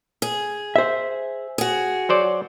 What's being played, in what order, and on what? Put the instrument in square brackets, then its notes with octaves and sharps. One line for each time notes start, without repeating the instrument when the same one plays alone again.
[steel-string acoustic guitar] G#4
[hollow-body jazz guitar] C5 E5
[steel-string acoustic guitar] F#4 G#4
[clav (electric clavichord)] F#3 C5 D5